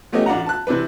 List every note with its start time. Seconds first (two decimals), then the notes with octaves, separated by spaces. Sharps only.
0.12 F3 A3 B3 C#4 G4 D#5
0.26 A1 D4 F4 F#5 A#5
0.46 A5 F#6
0.67 C3 E3 D4 B4